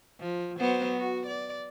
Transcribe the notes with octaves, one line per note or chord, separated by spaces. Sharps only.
F3
F#3 B3 C5
F#4
D5